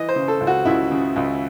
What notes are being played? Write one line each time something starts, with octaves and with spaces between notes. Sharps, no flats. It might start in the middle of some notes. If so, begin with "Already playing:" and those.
Already playing: E3 D#5
C5
C#3
A4
C#2
F#4
C#2 E4
C#3
C#2